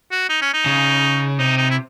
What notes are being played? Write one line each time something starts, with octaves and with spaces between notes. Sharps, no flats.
F#4
D#4
C#4
D#4
C#3
C3 D#4
D#4
E4